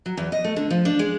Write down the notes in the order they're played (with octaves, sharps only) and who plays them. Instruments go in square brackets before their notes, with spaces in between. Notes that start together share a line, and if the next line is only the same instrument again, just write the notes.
[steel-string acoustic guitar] F#3
E2
D#5
A3
D3
F3
D4
G#3